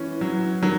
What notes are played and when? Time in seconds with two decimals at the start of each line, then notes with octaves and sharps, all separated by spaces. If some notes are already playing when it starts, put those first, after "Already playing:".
Already playing: E3 C#4
0.21 F#3
0.63 D#3 F#3